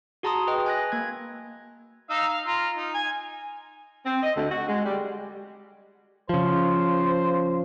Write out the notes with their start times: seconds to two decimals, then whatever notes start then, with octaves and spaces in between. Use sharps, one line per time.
0.23 F#4 G#4 A5 A#5 C6 D#6
0.47 B4 D#5 G5
0.66 G#5 F#6 A#6
0.92 A#3 G#6
2.10 D#4 F5 E6
2.29 F5
2.47 F4 A#5
2.77 D#4
2.94 G#5
4.06 C4
4.23 D#5
4.36 D2
4.51 F#4
4.68 G#3
4.85 G3
6.29 C#3 F3 C5